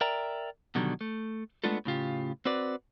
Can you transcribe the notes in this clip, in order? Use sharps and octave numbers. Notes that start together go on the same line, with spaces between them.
A#4 D5 E5 G5 A#5
B2 D3 D#3 F#3 G3
A3
G#3 A3 B3 D4 F4 A4
A2 C#3 F4 G4
C4 F#4 B4 D5